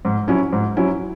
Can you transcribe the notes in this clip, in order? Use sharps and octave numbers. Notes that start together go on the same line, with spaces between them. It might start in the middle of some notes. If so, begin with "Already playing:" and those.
G#2
F#3 C#4 E4
G#2
F#3 C#4 E4